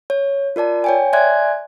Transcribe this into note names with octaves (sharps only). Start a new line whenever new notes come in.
C#5
F4 A#4 D5 A5
C#5 G5 G#5
D5 E5 G#5 C6 F#6 G#6